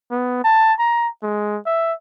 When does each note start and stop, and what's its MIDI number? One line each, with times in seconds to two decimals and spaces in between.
0.11 0.42 59
0.44 0.73 81
0.79 1.08 82
1.23 1.58 56
1.66 1.93 76